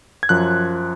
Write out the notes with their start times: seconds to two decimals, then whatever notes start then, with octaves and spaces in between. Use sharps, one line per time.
0.23 G#6
0.29 F#2 F3 F#6